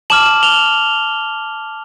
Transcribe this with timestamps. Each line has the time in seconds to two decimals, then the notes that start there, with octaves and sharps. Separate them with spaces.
0.10 A5 D6 F6 E7 F#7
0.43 F7 G7